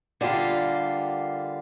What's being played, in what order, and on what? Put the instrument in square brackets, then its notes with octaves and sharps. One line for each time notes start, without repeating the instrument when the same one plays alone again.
[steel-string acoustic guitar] D3 G3 A#3 F4